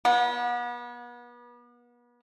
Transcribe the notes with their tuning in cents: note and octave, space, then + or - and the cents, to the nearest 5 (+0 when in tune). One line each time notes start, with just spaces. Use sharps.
B3 -35